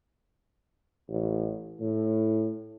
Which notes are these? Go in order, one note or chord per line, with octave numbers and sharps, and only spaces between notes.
A1
A2